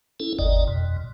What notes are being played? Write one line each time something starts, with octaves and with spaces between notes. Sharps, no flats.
C#4 E4 A4
G1 D#2 D5 D#5
F2 B2